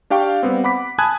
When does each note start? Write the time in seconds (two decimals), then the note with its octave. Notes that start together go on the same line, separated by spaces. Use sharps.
0.10 D4 G4 F5 G5 C#6
0.43 G3 B3 C4
0.64 F#5 B5 D6 B6
0.98 G#5 A5 B5 D#6 F#6 G#6